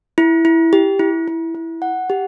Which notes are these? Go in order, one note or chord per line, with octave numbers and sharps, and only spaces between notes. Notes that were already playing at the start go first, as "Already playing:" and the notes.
E4
E4
G4
E4
E4
E4
F#5
G4